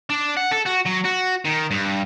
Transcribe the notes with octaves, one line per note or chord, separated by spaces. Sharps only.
D4
F#5
A4
F#4
F#3
F#4
D#3
G2